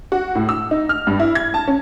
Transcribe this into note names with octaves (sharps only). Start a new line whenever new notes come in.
F#4
A2
E6
D#4
F6
G2
E4
G#6
A5
C#4